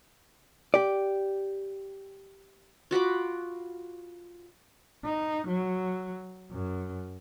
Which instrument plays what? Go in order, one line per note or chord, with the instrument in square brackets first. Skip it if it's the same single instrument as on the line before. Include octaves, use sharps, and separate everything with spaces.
[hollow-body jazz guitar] G4 D5
[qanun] F4 F#4 B5 D6
[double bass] D#4
F#3
F#2